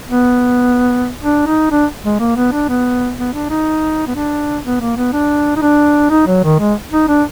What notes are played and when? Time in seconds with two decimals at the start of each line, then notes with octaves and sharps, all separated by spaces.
0.08 B3
1.23 D4
1.47 D#4
1.71 D4
2.04 G#3
2.20 A#3
2.36 B3
2.52 D4
2.69 B3
3.18 B3
3.34 D4
3.50 D#4
4.08 B3
4.15 D4
4.65 B3
4.80 A#3
4.97 B3
5.13 D4
5.57 D#4
5.62 D4
6.10 D#4
6.27 F#3
6.44 D#3
6.60 G#3
6.92 D#4
7.08 D4